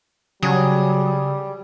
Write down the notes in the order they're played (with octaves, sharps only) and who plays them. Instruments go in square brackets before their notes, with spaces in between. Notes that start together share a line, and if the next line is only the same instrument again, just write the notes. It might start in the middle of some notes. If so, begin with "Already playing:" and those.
[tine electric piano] C#3 [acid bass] F#3 [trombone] G3 [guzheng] G#4